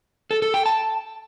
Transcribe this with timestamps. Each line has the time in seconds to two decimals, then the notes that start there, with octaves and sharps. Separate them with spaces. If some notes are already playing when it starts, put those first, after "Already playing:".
0.31 A4
0.42 A4
0.54 G5
0.66 A5